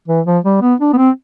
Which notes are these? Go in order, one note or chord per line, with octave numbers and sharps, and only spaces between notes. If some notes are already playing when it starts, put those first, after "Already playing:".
E3
F3
G3
B3
D4
B3
C4